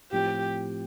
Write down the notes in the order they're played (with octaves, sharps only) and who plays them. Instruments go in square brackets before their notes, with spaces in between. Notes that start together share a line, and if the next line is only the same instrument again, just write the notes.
[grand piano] A2 F3 C4 [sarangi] G4